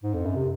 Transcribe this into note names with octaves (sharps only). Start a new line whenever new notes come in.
G#2
F2
F#2
C3